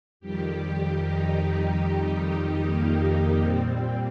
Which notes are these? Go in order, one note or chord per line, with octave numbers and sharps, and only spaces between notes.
F2 D#3 G3 G4
G4
D#4
A#3
A#2 G3 C4